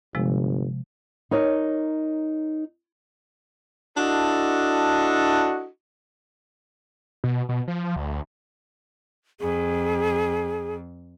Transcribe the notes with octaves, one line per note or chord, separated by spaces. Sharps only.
G1 C3 F3 G#3
D#4 A#4 C#5 D#5
D4 E4 F#4 A4 D#5
B2
B2
F3
D2
F2 G#4